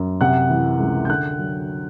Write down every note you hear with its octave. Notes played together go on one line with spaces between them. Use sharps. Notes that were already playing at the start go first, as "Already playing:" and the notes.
Already playing: F#2
C3 F#5 F#6
E3
C#2
G6
D3 F#5 F#6
F#3